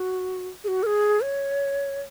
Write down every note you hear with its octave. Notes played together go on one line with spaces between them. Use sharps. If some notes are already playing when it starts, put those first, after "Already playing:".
Already playing: F#4
G#4
F#4
A#4
G#4
C#5